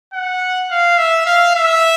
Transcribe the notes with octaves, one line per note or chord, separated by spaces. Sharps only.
F#5
F5
E5
F5
E5